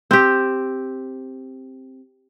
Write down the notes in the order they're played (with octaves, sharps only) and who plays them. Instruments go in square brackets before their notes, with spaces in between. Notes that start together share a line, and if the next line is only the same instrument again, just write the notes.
[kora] C4 G4